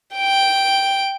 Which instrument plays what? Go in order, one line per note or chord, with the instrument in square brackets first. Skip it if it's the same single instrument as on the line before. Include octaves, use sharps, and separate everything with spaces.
[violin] G5 D7